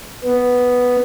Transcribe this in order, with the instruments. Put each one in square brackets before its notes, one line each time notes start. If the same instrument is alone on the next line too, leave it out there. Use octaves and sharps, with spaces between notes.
[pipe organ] B3